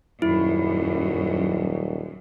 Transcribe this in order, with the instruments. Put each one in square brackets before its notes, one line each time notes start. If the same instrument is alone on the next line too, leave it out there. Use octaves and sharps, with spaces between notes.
[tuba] D#1 [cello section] F#2 [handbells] E4